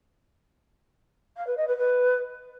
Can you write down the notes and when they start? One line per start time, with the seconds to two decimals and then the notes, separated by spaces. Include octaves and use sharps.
1.36 F5
1.47 B4
1.57 D#5
1.67 B4
1.78 B4